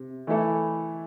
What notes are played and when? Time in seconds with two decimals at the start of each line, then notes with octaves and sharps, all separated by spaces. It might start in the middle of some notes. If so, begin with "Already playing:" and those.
Already playing: C3
0.27 E3 A3 E4 A4